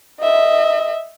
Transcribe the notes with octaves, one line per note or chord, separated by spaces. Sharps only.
D#5 E5